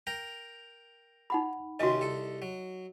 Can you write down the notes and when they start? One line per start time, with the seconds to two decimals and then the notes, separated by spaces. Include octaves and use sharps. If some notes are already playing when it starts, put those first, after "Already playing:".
0.07 A#4 G5 A#5
1.30 D#4 F#5 B5
1.80 D#2 C3 C#4 F#4 D#5
2.01 C2 A4
2.42 F#3